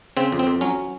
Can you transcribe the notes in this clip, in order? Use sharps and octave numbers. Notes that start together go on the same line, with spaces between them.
C#3 C4
F2
C4
F2
F#3 C#4